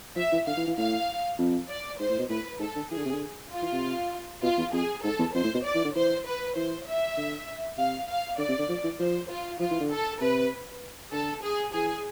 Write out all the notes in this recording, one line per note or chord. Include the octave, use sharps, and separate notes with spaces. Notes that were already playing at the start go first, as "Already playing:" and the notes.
F3 E5
E3
D3 F5
E3
E3
A2 F5
F2
D5
G#2 C5
A2
B2
A2 B4
G#2 A4
D3
E3 G#4
D3
C3
D3
F4
E3
C3
B2 F4
E2
F2 G#4
G#2 A4
E2
F2 C5
A2
B2
D5
E3
D3
E3 C5
B4
E3 C5
E5
D3
C3 F5
F5
D3 D5
C3
D3
F3
E3
F3 C5
F4
F3 F4
E3
D3
A4
C3 B4
D3 A4
G#4
E3 G#4